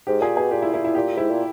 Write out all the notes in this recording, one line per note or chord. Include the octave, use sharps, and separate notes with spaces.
G#2 G4
A#2 G#4
B2 G#4
A#2 G4
E4
A#2 E4
E4
A#2 G4
G#2 E4
A#2